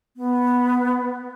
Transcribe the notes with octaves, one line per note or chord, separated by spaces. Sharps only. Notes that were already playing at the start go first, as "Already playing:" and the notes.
B3